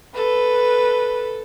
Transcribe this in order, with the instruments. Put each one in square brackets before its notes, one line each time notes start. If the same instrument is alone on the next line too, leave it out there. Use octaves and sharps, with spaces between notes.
[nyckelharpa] A4 [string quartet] B4